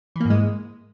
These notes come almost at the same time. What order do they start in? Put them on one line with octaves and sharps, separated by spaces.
E3 A#3 G#2 G#3